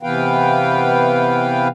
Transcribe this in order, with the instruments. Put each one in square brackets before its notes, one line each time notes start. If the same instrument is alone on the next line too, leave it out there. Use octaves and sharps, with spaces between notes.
[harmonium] C3 E3 B3 B4 F5 G5